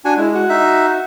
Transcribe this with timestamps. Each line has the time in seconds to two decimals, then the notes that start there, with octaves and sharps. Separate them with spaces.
0.05 D4 F#4 G#5
0.17 G#3 E4
0.35 F#4
0.49 D#4 E5